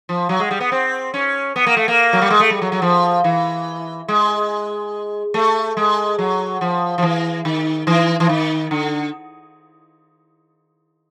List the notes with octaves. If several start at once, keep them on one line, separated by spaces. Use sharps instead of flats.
F3
F#3
G#3
G3
B3
C4
C#4
B3
A#3
A3
A#3
F#3
G3
G#3
A3
G3
F#3
F#3
F3
E3
G#3
A3
G#3
F#3
F3
F3
E3
D#3
E3
E3
D#3
D3